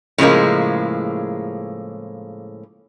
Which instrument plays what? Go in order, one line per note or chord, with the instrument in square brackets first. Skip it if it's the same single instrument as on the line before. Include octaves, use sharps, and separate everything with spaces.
[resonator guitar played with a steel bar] A2 C#3 F3 G#3 A#3